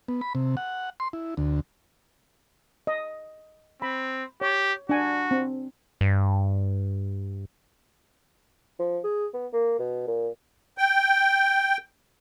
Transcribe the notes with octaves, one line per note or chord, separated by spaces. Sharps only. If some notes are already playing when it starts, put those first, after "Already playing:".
B3
B5
C3
F#5
C6
E4
D2
D#5
C4 B5
G4 C#5
D4 F#4 G#5
C4
G2
F3
G#4
B3
A#3
B2
A#2
G5